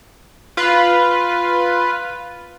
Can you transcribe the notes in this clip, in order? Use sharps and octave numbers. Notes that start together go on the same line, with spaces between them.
F4 B4